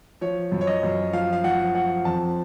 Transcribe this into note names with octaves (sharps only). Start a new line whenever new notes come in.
F3 C#5
F#2
C#5
D#5
F#2
F3 F5
F5
F3 F#5
F3 F#5
F2 A5